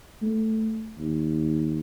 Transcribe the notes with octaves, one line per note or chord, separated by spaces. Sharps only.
A3
D#2